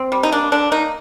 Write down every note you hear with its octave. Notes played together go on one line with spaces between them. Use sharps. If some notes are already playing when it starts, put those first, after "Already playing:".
Already playing: C4
G3
D#4
A#3 D4
D3 D4
A#3 D#4